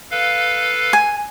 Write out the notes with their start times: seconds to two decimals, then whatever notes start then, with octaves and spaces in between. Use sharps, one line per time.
0.11 A4 B4 F5
0.93 G#5